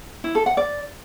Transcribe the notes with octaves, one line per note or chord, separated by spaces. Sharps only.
E4
A4
F#5
D5